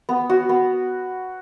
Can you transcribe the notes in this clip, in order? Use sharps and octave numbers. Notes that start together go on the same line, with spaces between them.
B3
F#4
B3